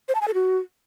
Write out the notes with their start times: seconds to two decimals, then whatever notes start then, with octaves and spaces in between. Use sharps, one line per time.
0.08 C5
0.15 A5
0.21 G#5
0.28 A4
0.34 F#4